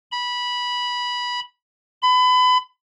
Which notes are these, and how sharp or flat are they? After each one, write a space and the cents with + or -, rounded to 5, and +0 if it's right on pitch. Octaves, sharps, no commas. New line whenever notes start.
B5 -15
B5 +30